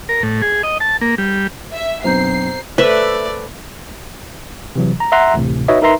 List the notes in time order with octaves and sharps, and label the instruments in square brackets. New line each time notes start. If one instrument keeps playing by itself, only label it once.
[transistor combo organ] A#4
A2
G#4
D#5
A5
A#3
G3
[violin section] E5
[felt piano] B1 F#2 C4 [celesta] C5 A#5 G6 [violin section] C7
[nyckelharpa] A3 D5 [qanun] B4 E5 [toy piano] C5
[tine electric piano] C3 E3 F#3
A#5
E5 F#5 A#5 C6 F#6
A1 D2 A2 C3
D#4 F#4 B4 C#5 D#5 E5
D#4 A#4 B4 E5 A#5 C6